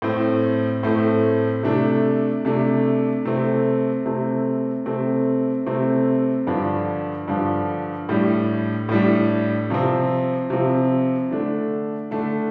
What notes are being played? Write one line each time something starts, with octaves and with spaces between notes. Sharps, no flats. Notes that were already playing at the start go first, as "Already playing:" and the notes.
A2 A3 C4
A2 A3 C4
C3 A3 D4
C3 A3 D4
C3 A3 C4
C3 A3 C4
C3 A3 C4
C3 A3 C4
G2 D3 F3 D4
G2 D3 F3 D4
A2 G3 D4
A2 G3 D4
C3 F3 C4
C3 F3 C4
D3 A3 D4
D3 A3 D4